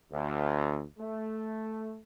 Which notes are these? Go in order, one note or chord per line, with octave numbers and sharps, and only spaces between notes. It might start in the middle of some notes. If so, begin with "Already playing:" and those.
D2
A3